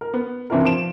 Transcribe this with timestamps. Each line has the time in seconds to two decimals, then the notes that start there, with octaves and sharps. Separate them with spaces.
0.01 A#4
0.14 B3
0.50 C3 E3 D4 E4 A#4
0.64 F3 D7 E7